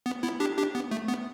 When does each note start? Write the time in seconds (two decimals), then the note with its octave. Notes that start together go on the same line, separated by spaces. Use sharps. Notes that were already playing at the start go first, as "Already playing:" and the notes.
0.06 B3
0.23 B3 E4
0.40 D4 G4
0.57 D4 G4
0.75 B3
0.91 A3
1.08 B3